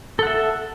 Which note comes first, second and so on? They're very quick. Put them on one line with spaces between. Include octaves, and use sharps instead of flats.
A4 F#5 E5